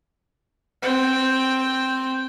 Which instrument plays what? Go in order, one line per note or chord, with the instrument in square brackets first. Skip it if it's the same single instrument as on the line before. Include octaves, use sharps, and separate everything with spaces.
[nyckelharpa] C4 G5